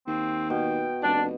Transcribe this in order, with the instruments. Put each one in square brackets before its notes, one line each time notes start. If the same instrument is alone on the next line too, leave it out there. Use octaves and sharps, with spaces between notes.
[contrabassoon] D#2 [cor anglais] C4
[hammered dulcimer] B2 [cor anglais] G5
[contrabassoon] F1 [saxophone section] D4